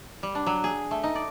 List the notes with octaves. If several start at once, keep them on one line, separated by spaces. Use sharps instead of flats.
G3
D4
F#3
G#4
A3
D#4
D5